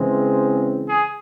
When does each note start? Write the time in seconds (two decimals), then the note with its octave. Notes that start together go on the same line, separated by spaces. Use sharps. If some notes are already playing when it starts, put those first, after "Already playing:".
Already playing: C#3 E3 G#3 C4
0.88 G#4